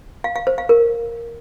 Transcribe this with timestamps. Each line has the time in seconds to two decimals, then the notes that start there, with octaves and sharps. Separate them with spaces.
0.24 F5
0.36 F5
0.47 C5
0.58 F5
0.69 A#4